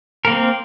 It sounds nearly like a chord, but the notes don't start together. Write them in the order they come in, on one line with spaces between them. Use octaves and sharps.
A#4 A#3 C4